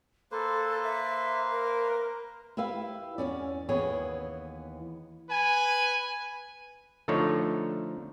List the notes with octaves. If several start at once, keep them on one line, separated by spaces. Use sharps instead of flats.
A#3 A4 B4 C5
E5
A#4
E4 G4 B4 E5 F5
E2 G#2 C#4 D5
D#2 E3 B3 G#4 C#5
B4 G#5
D3 F3 A3 D#4 C#5